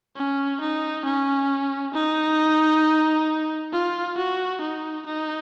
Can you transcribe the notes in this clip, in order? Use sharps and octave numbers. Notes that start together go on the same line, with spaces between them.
C#4
D#4
C#4
D#4
F4
F#4
D#4
D#4